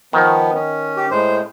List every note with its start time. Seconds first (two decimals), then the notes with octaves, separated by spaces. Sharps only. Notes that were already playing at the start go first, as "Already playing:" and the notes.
0.13 D#3 F3 B3
0.54 C#4
0.97 G4
1.11 A2 G#3 C5